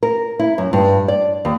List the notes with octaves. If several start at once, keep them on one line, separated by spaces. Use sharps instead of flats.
A#4
E4
F#2
G2
D5
D#2